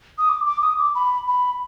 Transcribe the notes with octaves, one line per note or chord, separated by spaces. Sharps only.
D#6
D6
D6
D#6
D6
B5
B5